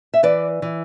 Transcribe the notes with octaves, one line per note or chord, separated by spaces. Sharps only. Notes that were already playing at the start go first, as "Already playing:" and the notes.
E5
E3 B4 D5
E3